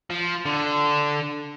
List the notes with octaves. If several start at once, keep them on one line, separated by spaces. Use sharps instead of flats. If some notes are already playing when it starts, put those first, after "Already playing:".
F3
D3